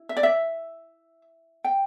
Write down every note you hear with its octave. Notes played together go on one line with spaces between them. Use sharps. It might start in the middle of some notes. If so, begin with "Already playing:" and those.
Already playing: E4
E5
D5
E5
G5